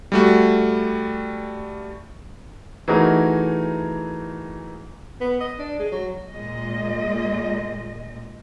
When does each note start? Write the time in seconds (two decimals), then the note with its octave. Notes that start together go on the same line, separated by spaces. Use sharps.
0.12 G3 A3 F#4
2.88 E3 A3 D#4 F#4 G#4 A#4
5.21 B3
5.40 D#5
5.59 D4
5.79 G#3
5.92 F#3
6.31 A#2 G#3 D#5